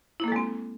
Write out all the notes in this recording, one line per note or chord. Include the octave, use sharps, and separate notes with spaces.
G#3 A#3 C4 E4 A4